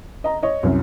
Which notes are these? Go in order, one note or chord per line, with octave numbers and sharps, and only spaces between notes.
D#5 A#5
C#5 D#5
C2 F#2